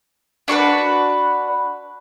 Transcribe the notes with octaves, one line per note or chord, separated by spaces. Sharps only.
D4 F#4 A#4 B4